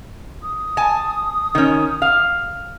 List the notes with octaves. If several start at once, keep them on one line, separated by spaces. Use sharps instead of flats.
D#6
G#5 A5
D#3 C#4
F5